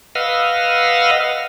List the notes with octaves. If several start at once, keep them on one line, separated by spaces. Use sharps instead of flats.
B4 D#5 F5 F#5 E6 F6